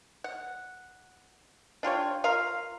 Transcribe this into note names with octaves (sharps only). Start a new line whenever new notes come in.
F#5
D4 F4 G4 C#5
F4 A#4 F5